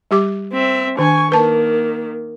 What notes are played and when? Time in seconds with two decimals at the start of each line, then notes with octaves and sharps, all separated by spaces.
0.11 G3 G4 D6
0.53 C4 E5
0.99 D#3 D4 G#5 C#6
1.32 D#3 A#3 B4 A5